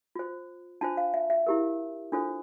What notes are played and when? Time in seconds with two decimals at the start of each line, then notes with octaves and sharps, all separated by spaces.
0.16 F4 C5
0.81 D4 F4 C5 A5
0.97 F5
1.14 E5
1.30 E5
1.47 E4 G4 A#4
2.12 D4 F4 A4 C5